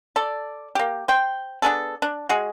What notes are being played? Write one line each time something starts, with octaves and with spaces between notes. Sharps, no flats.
A4 D5
A#3 G4
C5 G5
B3 D4 G#4 A4
D4
G#3 F#4 G#4